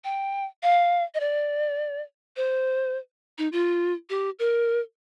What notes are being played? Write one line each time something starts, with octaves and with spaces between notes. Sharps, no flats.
G5
F5
D#5
D5
C5
D#4
F4
G4
A#4